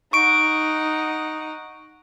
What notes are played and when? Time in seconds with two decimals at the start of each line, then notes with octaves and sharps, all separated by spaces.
0.13 D#4 F#5 C#6 D7